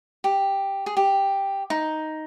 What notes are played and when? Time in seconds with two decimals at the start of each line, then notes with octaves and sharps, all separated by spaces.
0.24 G4
0.86 G#4
0.97 G4
1.70 D#4